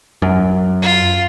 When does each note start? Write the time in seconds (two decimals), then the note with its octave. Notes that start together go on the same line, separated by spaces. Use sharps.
0.22 F#2
0.82 F4